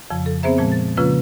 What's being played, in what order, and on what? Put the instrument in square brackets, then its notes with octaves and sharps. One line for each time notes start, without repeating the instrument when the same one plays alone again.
[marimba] F2 C#3 F3
A4
B3 C4 G#4 C5 E5 A#5
A#2 F3 G#3 A5
A6
C#3 F3 A#3 C#4 F4 B4